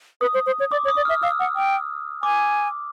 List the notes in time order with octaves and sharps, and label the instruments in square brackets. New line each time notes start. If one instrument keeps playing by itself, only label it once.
[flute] B4 [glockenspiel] D#6
[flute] C5
C5
C#5
[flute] D5 [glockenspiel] D6
[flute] C#5
[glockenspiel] D#6
[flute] D5
[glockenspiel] F6
[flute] E5
[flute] F5 [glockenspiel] E6
[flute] F#5
G5
[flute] G#5 [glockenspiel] D6